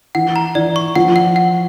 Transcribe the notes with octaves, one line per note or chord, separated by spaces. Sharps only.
E3 F#5
A#5
E3 D5
C#6
F3 F#5
F#5
F#5